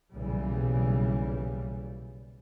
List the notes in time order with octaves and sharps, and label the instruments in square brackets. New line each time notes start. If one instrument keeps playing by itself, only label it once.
[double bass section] B1 A#2 C#3 E3 G3